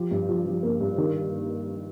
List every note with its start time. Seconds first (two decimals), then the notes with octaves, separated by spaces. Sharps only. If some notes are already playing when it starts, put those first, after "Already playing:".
Already playing: F3 G4
0.11 G2
0.29 F3
0.46 F3
0.63 A#3
0.81 G2
0.98 D#3